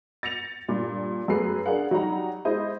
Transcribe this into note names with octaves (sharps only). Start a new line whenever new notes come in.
A6 A#6 C#7 F7
G2 A#2
F#2 A3 G#4 B4 C7
D4 G#4 A#4 F5 F#5
F#3 G3 D#4 F#5 A#5
G#3 E4 C5 D#5